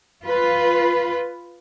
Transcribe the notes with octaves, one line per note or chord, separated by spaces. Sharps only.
F4 B4